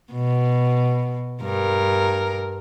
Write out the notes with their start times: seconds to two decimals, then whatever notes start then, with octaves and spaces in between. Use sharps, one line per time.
0.12 B2
1.42 G2 A#4